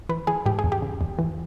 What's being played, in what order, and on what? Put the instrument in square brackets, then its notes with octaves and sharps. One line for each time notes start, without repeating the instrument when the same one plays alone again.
[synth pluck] E3 B4
E3 G#4
G#2 G4
G#4
E2
G4
C#3
E2
E3